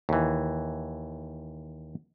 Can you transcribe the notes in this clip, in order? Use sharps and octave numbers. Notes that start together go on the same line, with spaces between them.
D#2 E3